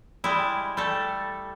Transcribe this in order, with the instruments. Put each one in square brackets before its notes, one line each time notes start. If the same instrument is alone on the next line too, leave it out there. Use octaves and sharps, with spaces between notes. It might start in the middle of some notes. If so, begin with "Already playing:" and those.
[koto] G3 G#3 E4
G3 A3 A4